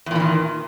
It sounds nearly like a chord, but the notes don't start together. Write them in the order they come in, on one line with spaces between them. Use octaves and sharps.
E2 A#2 E3 D#3